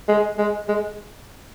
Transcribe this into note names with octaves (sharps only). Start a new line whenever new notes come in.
G#3
G#3
G#3